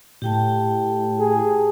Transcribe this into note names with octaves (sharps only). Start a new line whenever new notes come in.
A2 G4 G5 A5
G#4